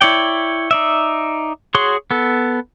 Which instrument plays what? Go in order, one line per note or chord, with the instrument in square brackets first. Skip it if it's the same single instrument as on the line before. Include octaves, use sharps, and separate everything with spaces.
[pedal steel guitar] E4 C#5 D5 G5
D#4 D5 E5
F#4 G#4 C#5 C6
B3 A4